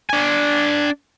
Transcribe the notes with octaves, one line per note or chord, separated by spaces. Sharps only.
D4 G#5